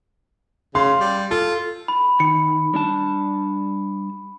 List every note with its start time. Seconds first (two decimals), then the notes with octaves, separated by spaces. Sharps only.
0.75 C#3 F5 C6
1.00 G3
1.31 F4 A4
1.88 B5
2.20 D#3 C#7
2.74 G3 D4 A5